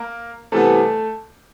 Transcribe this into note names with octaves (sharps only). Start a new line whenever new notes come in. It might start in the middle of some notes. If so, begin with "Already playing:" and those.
Already playing: A#3 A#4
C3 E3 G3 A3 B3 A4